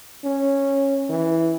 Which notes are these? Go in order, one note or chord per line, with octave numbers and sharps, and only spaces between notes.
C#4
E3